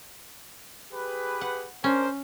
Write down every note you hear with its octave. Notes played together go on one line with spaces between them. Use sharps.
G4 G#4 B4
F#5
C#4 D4 A#4 C5